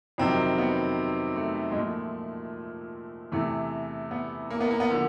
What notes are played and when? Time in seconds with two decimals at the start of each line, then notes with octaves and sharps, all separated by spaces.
0.18 F2 C3 D#3 F#3 C4
0.58 B3
1.36 A3
1.72 G#3
1.76 A#2 F3 A3
3.32 E2 C3 E3 A3
4.11 B3
4.51 A#3
4.61 B3
4.71 A#3
4.80 B3
4.90 D3 F3 A#3